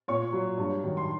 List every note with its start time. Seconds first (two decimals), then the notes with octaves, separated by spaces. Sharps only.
0.08 A#2 C#5 C#6
0.33 F#3
0.57 G2
0.83 D#3 F#3
0.97 C6